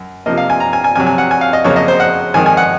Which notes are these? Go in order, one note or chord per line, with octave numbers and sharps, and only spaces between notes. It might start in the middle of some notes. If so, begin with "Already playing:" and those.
Already playing: F#2
C3 F3 A#3 D#5
F5
G#5
A#5
G#5
G#5
F2 C3 F#3 G#5
G#5
F#5
G#5
F5
D#5
F2 C#3 F#3 A#3 C#5
D#5
C5
F#5
F2 D#3 G#3 G#5
G#5
F#5